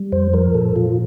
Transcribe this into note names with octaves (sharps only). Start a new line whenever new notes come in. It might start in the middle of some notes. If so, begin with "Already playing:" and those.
Already playing: G3
F2 C5
F3 A#4
A#2 A4
A#2 F4